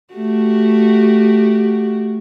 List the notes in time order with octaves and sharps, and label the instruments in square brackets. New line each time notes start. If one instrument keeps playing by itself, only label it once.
[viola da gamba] A3 F#4 G4